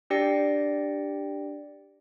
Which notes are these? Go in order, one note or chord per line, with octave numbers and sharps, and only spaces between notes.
D4 G4 D5 G5 A#6 C#7